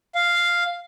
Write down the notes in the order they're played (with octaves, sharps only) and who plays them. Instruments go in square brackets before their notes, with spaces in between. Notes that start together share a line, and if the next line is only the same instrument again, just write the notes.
[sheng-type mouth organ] F5